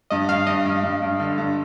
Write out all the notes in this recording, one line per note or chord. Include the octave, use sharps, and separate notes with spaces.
G2 D#5
G2 F5
G2 D#5
G2
G2
G2
D3
G2